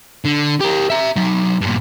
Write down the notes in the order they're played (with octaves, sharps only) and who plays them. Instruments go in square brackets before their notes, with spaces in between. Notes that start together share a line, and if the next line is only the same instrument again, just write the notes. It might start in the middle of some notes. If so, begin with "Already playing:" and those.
[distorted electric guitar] D3
G4 A#4
E5 A#5
F#3 D#4
G2 A#2